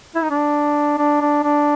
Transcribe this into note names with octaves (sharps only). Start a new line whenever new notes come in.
E4
D#4
D4
D4
D4
D4